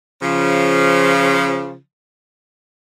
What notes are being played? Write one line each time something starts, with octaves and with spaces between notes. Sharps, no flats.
C#3 F3